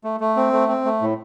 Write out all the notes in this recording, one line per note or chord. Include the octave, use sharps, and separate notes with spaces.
A3
A3
C4
A3
C4
A3
A2